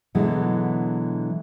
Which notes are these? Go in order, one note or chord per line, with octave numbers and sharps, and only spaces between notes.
B2 D3 E3 F#3 G#3